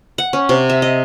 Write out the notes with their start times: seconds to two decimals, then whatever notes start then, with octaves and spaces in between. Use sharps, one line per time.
0.18 F#5
0.33 C#4
0.49 C3
0.70 E5
0.82 D#5